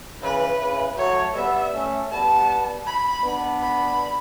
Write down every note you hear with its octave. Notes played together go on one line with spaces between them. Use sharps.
C#3 E3 B4
C#3 E3
F#3 A3 C#5
G3 B3 E5
A3 C#4
G3 B3 A5
B5
B3 D4
B5